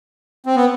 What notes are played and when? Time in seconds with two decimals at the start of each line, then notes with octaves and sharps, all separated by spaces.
0.46 C4
0.56 B3